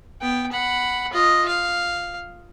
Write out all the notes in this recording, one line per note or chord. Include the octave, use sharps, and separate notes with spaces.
B3 G5
F#5 B5
F4 D#5
F5